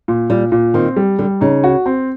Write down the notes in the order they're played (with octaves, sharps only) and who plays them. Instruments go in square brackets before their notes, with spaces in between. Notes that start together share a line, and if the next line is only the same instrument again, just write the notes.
[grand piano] A#2
[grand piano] A#2 [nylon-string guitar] G3
[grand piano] A#2
[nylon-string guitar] D#3 [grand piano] C4
[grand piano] G3
[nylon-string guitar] D3 [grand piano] G3
[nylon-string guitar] C#3 [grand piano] D#4
[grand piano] F#4
C4